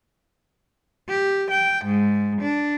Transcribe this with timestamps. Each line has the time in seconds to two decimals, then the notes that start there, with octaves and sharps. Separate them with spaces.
1.09 G4
1.51 G5
1.85 G#2
2.41 D4